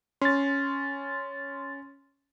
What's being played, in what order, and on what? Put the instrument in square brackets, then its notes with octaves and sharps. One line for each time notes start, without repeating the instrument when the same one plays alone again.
[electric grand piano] C#4 [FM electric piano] C6 A6